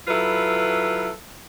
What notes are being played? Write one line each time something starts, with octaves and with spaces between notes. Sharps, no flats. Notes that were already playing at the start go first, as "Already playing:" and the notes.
F#3 E4 F4 A4 B4